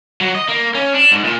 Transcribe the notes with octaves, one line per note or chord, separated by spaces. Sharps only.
F#3
D#5
A#3
C#4
D4
G#2
A#2